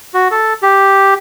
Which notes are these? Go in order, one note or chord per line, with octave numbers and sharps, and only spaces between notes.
F#4
A4
G4